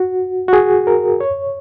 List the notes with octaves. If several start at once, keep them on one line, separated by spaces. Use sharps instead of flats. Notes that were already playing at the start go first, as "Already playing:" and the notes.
Already playing: F#4
F#4
G#4
A#4
C#5